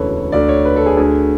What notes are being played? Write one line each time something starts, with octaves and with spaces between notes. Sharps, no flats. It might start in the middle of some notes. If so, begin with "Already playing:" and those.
Already playing: E1 D2 C#3 E3 A4 B4 C#5
D2 D3 D5
C#5
B4
A4
G#4
D2 D3 G#4